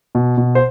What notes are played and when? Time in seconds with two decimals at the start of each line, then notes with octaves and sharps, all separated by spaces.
0.15 B2
0.37 B2
0.55 C5